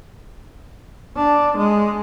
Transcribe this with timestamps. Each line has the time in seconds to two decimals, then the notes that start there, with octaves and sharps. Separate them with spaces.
1.16 D4
1.58 G#3